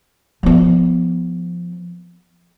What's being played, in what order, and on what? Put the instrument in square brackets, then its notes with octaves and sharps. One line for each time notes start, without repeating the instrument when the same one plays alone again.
[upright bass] F3 B3